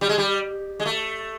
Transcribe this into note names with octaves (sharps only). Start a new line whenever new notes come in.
G3
G#3
G3
G#3
A3